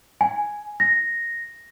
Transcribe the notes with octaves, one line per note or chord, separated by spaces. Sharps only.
G#5
A#6